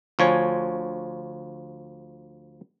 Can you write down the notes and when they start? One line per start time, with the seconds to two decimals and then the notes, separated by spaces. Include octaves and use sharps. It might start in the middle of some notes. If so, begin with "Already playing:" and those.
0.19 D2 F3 C#5 G#5